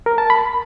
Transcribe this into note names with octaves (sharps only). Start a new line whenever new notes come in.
A#4
A5
B5